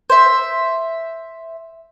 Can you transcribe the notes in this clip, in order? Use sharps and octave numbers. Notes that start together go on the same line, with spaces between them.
C5 E5